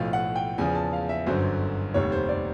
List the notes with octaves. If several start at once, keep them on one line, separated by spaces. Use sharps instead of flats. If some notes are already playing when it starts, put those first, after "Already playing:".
Already playing: B1 A2 F3 F5
F#5
G5
E2 C#3 F3 G#5
A5
F5
E5
G1 F#2 D3 F#3 C5
F1 D#2 D#3 G3 C#5
C5
D5